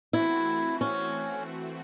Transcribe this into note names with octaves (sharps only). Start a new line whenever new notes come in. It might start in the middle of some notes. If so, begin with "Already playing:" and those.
E3 A3 C4 E4 F#4
C#4